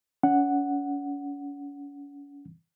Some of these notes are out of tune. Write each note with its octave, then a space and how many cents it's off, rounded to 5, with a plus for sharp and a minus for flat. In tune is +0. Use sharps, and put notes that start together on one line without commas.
C#4 +40 F#5 +0